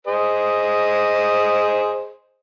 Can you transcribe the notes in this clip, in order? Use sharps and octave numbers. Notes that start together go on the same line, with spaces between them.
G#4 C5 D#5